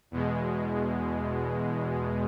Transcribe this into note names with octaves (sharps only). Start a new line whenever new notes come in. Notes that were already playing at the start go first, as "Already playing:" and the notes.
E2 B2 G#3